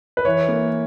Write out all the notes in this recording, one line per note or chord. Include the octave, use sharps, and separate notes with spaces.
B4
E3 C#5
A#3